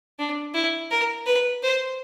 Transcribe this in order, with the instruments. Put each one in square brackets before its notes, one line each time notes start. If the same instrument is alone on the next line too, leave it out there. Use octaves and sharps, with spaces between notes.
[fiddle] D4
E4
A#4
B4
C5